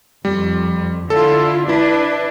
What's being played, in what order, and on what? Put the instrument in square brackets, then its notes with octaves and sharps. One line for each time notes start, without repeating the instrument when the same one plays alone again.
[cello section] F2 [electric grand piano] G3
[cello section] D3 E4 F4 [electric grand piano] A4
[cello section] D4 B4 [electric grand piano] E4